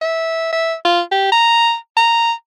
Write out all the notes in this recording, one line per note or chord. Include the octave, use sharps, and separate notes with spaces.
E5
E5
F4
G4
A#5
A#5